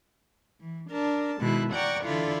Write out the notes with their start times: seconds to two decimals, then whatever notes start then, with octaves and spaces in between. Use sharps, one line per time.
0.60 E3
0.90 D4 A#4 A5
1.39 B2 D#3 G#3 E4 F#6
1.72 D5 F#5 G5 A#5 C#6
2.04 D3 E3 E4 F4 A4 D5